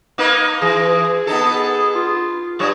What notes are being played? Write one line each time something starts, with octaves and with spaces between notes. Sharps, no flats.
A#3 D#4 B4
E3 G#4
B3 D#4 A4
F4
G2 G3 C#5